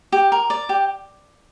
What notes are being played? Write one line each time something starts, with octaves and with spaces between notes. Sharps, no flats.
G4
A#4
D5
G4